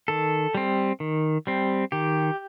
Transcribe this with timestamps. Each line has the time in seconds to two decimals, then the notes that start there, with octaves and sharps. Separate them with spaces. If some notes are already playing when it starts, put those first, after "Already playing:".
0.08 D#3 A4
0.55 G3 C4
1.00 D#3
1.47 G3 C4
1.92 D#3 G4